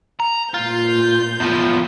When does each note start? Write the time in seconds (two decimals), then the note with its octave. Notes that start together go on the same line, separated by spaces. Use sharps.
0.20 A#5
0.54 A#2 F4 G6
1.40 E2 F3